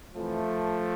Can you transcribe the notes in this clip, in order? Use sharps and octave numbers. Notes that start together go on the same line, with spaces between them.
F2 E3 F3 A3